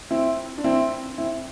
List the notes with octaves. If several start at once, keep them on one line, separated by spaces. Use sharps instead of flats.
C4 E4
D4
C4 E4
C4 E4